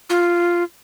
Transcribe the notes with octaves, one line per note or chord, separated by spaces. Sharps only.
F4